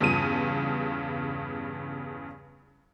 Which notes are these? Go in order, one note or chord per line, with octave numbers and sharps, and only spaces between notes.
E2 G2 C#3 F4 D#7